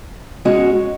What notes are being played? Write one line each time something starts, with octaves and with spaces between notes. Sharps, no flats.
G#3 C#4 F#4